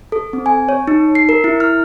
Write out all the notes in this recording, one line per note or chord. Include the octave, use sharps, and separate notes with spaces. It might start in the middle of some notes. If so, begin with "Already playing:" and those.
A4
C4
G#5
C#5
D#4
C7
A#4
E4
F6